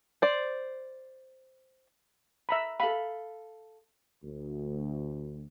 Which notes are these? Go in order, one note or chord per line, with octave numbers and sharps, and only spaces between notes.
C5 D5
E5 A#5 B5
A4 F5 B5
D2